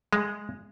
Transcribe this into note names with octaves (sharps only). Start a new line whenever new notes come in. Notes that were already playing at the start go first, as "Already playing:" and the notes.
G#3